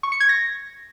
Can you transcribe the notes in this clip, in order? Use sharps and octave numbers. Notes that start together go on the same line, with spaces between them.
C#6
C#7
G#6
A#6